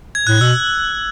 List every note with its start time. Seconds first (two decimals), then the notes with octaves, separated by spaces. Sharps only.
0.15 G#6
0.27 A2 F#6
0.41 B2 E6